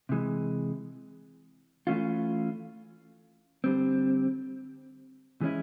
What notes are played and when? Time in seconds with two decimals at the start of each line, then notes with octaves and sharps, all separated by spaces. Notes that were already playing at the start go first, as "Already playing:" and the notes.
0.09 C3 E3 G#3
1.87 E3 A3 C#4 F4
3.64 D3 G3 C4
5.41 E3 G#3 C#4 E4